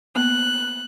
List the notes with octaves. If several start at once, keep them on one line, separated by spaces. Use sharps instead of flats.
A#3 B3 F#6